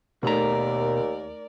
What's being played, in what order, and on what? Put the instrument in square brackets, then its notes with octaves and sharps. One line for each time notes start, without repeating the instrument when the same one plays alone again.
[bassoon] D#2 [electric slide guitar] B2 A#5 [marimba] A3 D#4 A4 [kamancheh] A#4 D5